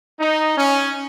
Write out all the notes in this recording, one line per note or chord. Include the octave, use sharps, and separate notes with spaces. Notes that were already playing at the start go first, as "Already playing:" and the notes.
D#4
C#4